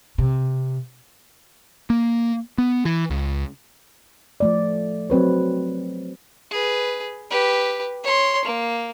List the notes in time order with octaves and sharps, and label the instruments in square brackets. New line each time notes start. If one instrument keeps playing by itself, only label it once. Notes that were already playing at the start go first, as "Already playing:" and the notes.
[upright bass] C3
[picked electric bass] A#3
B3
E3
C#2
[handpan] F3 A3 D5
F#3 C4 B4 C#5
[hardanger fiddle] G#4 B4
G4 B4
C#5 C6
A#3